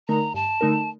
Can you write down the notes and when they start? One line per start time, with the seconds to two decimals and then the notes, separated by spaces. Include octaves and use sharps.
0.08 D3 A3 D#4 A#4 A#5
0.34 G2 A5
0.61 D3 A3 D#4 A#4